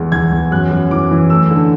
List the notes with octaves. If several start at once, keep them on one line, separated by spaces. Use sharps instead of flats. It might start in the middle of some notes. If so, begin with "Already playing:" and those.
Already playing: E2 G#3
E2 G#6
E2
F#2 F#6
F#2
E3 D6
E3
A3 E6
D3